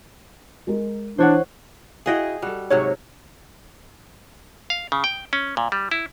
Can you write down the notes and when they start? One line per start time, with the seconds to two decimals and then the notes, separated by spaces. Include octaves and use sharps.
0.67 G#3 A#4
1.18 E3 D4 E4 C5 C#5 F#5
2.06 E4 F#4 G#4 D#5 F5 G5
2.42 G3 F#4 A4
2.70 G#2 C3 F#3 C#5
4.70 F5
4.92 C#3
5.04 G5
5.33 C#4
5.57 A#2
5.72 G3
5.91 E4